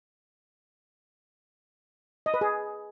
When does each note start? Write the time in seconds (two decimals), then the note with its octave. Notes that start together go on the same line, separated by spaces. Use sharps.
2.26 D#5
2.34 B4
2.41 G#4